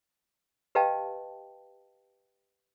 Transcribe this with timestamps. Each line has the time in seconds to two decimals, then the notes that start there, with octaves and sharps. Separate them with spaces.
0.75 G4 B4 D#5 F5 G5 A5